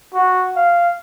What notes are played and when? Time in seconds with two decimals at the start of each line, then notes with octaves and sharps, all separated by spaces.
0.14 F#4
0.56 F5